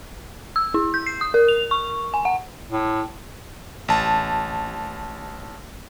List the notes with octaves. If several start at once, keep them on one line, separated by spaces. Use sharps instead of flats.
E6
E4
G6
C7
D#6
A#4
F7
C#6
G#5
F#5
A2
A1 A5